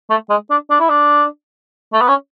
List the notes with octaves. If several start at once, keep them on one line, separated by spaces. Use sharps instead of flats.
A3
G#3
D4
D4
E4
D4
A3
B3
C#4